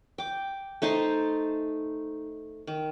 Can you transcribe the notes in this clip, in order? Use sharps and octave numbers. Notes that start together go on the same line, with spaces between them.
G5 D6
A3 D#4 C5 A5
D#3